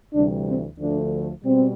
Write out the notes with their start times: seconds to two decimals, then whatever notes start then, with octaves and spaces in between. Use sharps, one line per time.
0.13 D2 C3 E3 G3 D4
0.45 C4
0.78 D2 D3 F3 A3 D4
1.43 B2 G3 C4